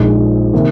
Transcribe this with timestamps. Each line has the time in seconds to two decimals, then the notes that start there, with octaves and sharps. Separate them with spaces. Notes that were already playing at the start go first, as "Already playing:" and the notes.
Already playing: A#1 A#2 F3 G#3 D#4
0.53 C3 D#3 A#3